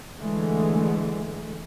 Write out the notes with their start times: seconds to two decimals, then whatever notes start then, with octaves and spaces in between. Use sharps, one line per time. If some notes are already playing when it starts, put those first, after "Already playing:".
0.18 D3 E3 G#3 A3